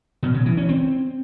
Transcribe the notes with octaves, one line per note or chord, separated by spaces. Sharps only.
B2
C#3
E3
C#4
C4